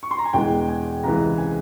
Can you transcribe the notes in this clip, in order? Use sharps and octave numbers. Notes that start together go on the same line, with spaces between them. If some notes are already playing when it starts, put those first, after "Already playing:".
C#6
C6
A#5
G#5
E1 E2 E3 G#3 G5
G#5
C#2 C3 E3 G#3 A#5
G#5